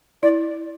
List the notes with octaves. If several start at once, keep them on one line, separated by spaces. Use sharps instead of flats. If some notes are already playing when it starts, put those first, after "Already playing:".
E4 D5